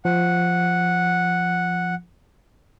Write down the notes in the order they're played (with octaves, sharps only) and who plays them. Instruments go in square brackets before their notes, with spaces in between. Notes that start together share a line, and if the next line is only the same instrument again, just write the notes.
[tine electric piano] F3 [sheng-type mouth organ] F#5